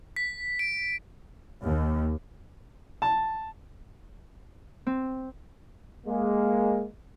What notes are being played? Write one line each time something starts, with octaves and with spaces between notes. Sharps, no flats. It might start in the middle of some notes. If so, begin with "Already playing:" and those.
B6
D7
D#2
A5
C4
G#3 A#3